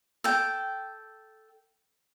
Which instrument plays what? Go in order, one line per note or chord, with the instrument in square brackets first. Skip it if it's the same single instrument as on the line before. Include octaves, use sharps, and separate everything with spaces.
[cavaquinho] A4 G5